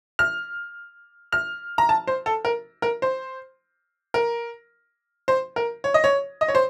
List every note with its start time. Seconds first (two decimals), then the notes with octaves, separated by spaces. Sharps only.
0.19 F6
1.32 F6
1.78 A#5
1.89 A5
2.07 C5
2.26 A4
2.45 A#4
2.82 A#4
3.02 C5
4.14 A#4
5.28 C5
5.56 A#4
5.84 C#5
5.94 D#5
6.04 C#5
6.41 D#5
6.48 C#5
6.55 C5